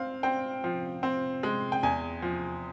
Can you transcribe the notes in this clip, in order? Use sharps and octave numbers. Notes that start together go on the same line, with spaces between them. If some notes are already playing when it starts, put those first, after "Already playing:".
Already playing: C4 F5
C4 G5
F3
C4
G#3
G5
E2 G#5
F3